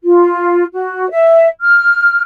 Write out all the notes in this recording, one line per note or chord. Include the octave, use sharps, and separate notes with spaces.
F4
F#4
E5
F6